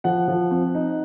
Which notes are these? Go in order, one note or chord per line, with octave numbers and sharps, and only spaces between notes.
F3 F#5
F3
C4
D#4